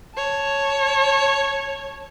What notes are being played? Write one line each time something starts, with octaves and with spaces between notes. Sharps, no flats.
C#5 A5